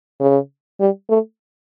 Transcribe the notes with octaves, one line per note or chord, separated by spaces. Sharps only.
C#3
G3
A3